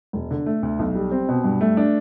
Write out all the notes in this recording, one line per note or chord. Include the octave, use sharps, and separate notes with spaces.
E1
D3
A3
D2
B1
G3
C4
B2
G2
A3
D4